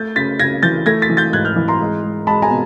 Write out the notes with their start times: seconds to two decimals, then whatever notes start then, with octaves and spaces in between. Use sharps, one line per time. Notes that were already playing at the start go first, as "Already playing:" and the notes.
Already playing: A3 G6 A6
0.16 C#3 A6 B6
0.39 C#3 G#6 A#6
0.63 E3 G6 A6
0.86 A3 G#6 A#6
1.02 A6 B6
1.10 E3
1.17 G6 A6
1.33 G#2 F#6 G#6
1.45 F6 G6
1.56 E3
1.68 A#5 C6
1.80 G#3
2.03 G#3
2.27 G#3 A5 B5
2.42 G#5 A#5
2.50 B2